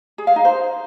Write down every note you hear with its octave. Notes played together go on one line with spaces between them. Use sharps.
G#4
F5
D#4
C5